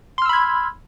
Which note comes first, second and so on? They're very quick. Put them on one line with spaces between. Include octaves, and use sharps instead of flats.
C6 F6 E6 B5 G#6